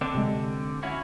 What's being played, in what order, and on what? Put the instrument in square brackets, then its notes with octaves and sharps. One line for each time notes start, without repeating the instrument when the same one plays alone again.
[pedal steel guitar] D3 C4 D4
[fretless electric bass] C3 G#3
[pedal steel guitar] C#4 E4 F#4